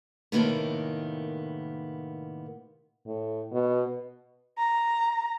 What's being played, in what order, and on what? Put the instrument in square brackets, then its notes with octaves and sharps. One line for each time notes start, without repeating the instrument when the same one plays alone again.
[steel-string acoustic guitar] A2 C3 D#3 A#3 B3
[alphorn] A2
B2
[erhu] A#5